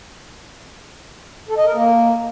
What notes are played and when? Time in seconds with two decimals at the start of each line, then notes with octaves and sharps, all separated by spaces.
1.49 A4
1.57 D#5
1.66 A#4
1.74 A#3